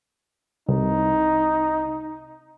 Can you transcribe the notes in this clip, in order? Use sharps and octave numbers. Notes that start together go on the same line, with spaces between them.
C2 D#4